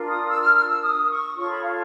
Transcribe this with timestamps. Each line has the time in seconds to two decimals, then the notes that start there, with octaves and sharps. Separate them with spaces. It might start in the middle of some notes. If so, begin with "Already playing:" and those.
Already playing: D4 F4 A#4
0.09 D#6
0.27 E6
0.41 F6
0.54 F6
0.67 E6
0.82 D#6
1.09 C#6
1.36 F4 A4 C#5 C#6
1.49 B5
1.64 F5